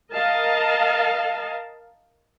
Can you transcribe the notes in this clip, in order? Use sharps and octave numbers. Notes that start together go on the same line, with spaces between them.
A#4 D#5 F5 A5